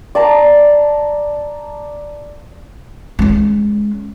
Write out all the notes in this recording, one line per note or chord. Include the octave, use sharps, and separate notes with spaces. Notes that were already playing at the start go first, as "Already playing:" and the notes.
D5 A5 A#5
G#3 C#4